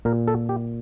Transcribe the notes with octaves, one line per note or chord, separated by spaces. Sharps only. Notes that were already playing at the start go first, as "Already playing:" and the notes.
A#2 A#4
A4
G4